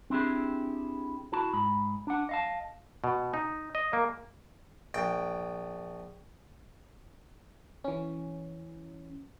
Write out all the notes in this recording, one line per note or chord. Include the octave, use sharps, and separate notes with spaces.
C4 D4 E4 G4 G#4
E4 F#4 A5
G#2 B5
D4 F#5
D#5 F5 A5
B2
D#4
D#5
A#3
A#1 G5
E3 C#4